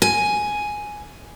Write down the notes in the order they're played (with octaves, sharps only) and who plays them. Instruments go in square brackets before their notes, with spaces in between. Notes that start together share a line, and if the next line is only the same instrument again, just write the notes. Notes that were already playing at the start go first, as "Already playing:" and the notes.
[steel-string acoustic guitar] G#5